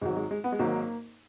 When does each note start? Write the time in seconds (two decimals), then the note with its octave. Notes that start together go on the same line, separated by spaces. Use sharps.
0.01 G#1 G#2 F#3 G#3
0.16 G#3
0.31 G#3
0.44 B3
0.52 G#3
0.59 G#1 G#2 F#3 A#3